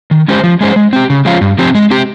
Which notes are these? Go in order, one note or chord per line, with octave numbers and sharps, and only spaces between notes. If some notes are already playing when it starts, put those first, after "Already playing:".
D#3
G#3 C#4 G4 C5
F3
G#3 C#4 G#4 C5
G#3
C4 G4
C#3
F3 G#3 C#4 F4
G2
F3 C4 G4
G#3
C4 G4